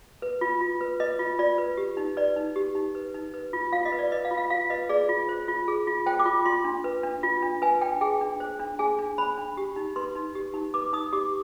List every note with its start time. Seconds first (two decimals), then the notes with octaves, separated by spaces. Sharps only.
0.22 B4
0.41 F4
0.61 F4
0.81 B4
1.00 B4 D#5
1.19 F4
1.39 F4 D5
1.58 B4
1.77 G4
1.97 D#4
2.17 B4 D5
2.36 D#4
2.56 G4
2.75 D#4
2.95 B4
3.14 D#4
3.34 B4
3.53 F4
3.73 F4 F5
3.85 D#5
3.92 B4
3.99 D5
4.12 B4 D#5
4.25 F5
4.31 F4
4.37 F5
4.50 F4 F5
4.70 B4 D#5
4.89 G#4 D5
5.09 F4
5.29 C5
5.48 F4
5.68 G#4
5.87 F4
6.06 C5 G5
6.19 D6
6.26 F4
6.45 F4 C6
6.65 D4
6.84 B4
7.03 D4
7.23 F4
7.42 D4
7.62 B4 G#5
7.81 D4 G5
8.01 G#4 G5
8.21 D4
8.40 C5
8.59 D4
8.79 G#4 G#5
8.99 D4
9.18 C5 B5
9.38 D4
9.57 G4
9.76 D#4
9.96 B4 C6
10.15 D#4
10.35 G4
10.54 D#4
10.74 B4 D6
10.93 D#4 D#6
11.12 G4 D6